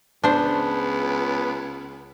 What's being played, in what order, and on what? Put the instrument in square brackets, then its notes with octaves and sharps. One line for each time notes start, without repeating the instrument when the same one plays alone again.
[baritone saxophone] C#2 [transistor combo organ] B3 [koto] D4 C5